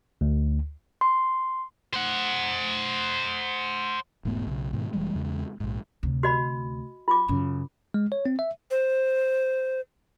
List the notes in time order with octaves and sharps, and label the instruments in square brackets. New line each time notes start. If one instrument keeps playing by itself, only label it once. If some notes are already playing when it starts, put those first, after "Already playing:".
[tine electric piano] D2
[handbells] C6
[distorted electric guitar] C5 F#5
[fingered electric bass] E1 G#2 A3 B3
B1 C#3
G#2 B2 D#3
F1 E3 G3 G#3
E2 C#3 G#3
A#1 G#2
[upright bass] D2 C3
[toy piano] F#4 D#5 B5
F4 D6
[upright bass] F#2 C#3
[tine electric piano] G#3
C#5
C4
E5
[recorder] C5